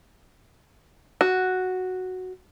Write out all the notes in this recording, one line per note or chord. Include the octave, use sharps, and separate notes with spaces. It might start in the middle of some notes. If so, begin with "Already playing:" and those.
F#4